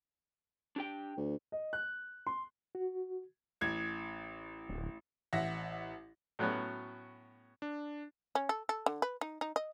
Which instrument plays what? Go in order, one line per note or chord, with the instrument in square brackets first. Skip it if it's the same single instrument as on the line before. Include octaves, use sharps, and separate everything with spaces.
[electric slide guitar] D4 G4 G5
[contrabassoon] D2
[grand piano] D#5
F#6
C6
[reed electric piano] F#4
[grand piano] A1 G#6
[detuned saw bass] D1
[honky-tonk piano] A1 E5 F#5 A#6
[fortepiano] A2 F#3 B3 C#4 F#4
[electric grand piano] D4
[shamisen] C#4
A4
A4
D3
B4
D#4
D#4
D#5